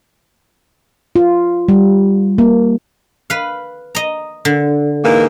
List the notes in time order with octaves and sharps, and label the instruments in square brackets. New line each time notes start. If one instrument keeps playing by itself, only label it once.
[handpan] F4
G3
A#3
[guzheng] B4 F5
D#5 A#5
D3
[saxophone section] G#2 E3 A#3